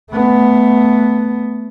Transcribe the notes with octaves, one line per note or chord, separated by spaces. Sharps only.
A3 B3